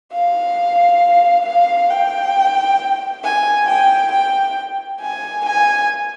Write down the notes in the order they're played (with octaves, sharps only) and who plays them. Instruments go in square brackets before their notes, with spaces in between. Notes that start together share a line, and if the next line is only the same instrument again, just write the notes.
[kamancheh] F5
F5
G5
G#5
G5
G5
G#5
G#5